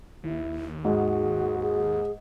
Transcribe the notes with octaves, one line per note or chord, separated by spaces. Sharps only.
D#2 E4
G#2 F#4 G#4
G#4